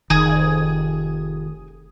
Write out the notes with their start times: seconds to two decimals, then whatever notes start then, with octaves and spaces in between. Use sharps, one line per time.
0.10 F1 D#3 G#4